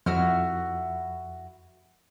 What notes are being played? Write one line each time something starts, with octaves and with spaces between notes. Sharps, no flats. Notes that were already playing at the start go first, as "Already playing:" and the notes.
F2 E4 F#4 F6